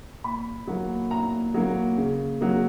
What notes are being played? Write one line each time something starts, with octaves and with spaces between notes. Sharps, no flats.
A#2 B5
F#3 A#3
A#2 A#5
F#3 A#3
C#3
F#3 A#3